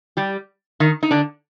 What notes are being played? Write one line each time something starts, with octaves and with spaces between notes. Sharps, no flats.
G3 G4
D#3 D#4
D#4
D3 D4